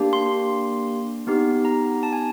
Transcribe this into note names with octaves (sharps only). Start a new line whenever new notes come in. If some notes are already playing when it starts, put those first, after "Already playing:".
Already playing: A#3 D4 G4
C6
B3 D#4 G4
A#5
A5
G#5